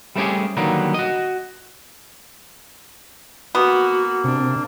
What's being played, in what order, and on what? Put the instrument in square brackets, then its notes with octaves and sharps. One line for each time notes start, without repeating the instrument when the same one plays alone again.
[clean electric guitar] G3 A3 C4 C#4 G4 G#4
D3 D#3 F#3 G3 A#3 B3
F#4 D#5
[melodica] A#3 [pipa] B3 [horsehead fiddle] F#4
[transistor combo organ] C3 [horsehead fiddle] D4